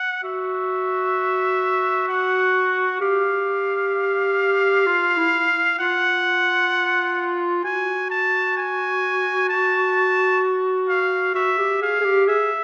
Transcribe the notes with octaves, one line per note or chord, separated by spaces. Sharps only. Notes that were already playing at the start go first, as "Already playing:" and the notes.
Already playing: F#5
F#4 E5
F#5
G4 F5
F4
E4
F4 F#5
F#4 G#5
A5
G#5
A5
F5
F#4 E5
G4
G#4 F5
G#4
G4
G#4 E5